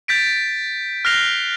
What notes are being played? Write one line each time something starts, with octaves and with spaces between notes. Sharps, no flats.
G6 A6 B6 D7
F6 F#6 A#6 C7 F7 G7